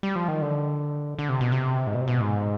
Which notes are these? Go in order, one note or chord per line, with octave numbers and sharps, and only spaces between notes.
G3
F3
D#3
D3
D3
C3
B2
C3
G#2
B2
C3
B2
G#2